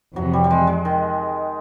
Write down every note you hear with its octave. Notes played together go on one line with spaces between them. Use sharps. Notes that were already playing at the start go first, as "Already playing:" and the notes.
F2 C3 E3 F#3
G3
G3
G#3
G#3
D#3